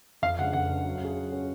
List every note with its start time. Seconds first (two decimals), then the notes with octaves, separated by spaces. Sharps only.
0.22 F2 F5
0.38 C#3 G#3 D4 F#5
0.53 F2 F#5
0.69 C#3 G#3 D4
0.85 F#3
1.01 C#4 G#4
1.16 F#3
1.32 C#4 G#4